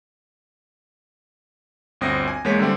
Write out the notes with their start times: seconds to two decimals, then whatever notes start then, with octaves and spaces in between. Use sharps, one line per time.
2.01 G1 D2 C4 D#6 A#6
2.28 G#5
2.45 E2 G#3 A#3 C#5 B6
2.59 D3 G3 A3 C4